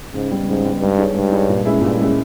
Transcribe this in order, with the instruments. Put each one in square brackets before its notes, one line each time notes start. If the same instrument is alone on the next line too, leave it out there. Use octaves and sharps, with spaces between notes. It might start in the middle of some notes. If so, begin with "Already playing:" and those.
[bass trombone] G#2 [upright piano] C#3
[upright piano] G3 B3
[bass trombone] G#2 [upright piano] C#3
[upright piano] G3 B3
[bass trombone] G2 [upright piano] G#3
[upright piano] D#4 G#4 C#5
[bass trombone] G2 [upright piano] G#3
[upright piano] D#4 G#4 C#5
A#2
G#3 C#4 E4 G#4
[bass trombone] G2 [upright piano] A#2
[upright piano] G#3 C#4 E4 G#4